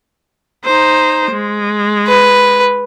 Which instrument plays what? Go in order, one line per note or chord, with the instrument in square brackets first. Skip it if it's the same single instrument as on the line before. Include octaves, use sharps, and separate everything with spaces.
[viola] D#4 C5
G#3
[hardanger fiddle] B4